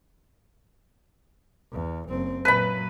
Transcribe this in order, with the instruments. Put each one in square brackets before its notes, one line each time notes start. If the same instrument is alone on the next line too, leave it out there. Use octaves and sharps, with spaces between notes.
[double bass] E2
F#1 C4
[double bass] A#2 F#3 [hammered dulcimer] B4 B5